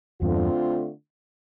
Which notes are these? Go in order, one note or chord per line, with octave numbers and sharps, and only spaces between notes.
E2 G2 D3 A3 C4 F4